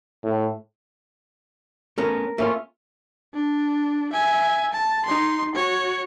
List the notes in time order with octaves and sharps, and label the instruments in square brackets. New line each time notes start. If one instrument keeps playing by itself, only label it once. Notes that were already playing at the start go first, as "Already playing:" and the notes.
[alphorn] A2
[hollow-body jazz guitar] A3 B3 C#4 [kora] A#4
[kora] A3 C#4 F4 [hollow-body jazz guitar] A#3
[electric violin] D4
E5 G#5
A5
D#4 C6
F#4 C#5